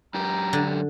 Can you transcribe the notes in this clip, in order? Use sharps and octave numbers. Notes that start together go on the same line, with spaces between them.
F#2 G4 A#5
D3